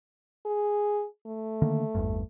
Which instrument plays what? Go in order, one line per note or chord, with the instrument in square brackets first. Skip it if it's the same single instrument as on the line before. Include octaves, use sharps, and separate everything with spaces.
[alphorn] G#4
A3
[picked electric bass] D3 D#3 A#3
G#1 E2 G2